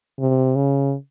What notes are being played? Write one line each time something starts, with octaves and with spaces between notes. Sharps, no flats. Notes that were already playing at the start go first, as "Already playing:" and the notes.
C3
C#3